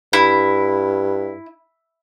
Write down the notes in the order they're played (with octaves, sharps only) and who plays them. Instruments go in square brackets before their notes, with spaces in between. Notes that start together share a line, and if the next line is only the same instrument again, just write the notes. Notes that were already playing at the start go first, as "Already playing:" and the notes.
[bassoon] G2 [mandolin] E4